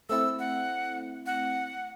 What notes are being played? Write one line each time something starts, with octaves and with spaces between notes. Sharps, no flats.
A3 C4 E4 E6
F#5
F#5